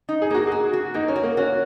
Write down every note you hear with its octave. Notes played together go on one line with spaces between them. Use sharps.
D#4
G#4
A#3 F#4
G#4
F#4
F#4
A#3 D#4
C#4
F#4
A#3
C#4 F#4